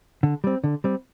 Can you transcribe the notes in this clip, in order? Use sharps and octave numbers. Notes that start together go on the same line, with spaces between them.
D3
G3 C4
D3
G3 C4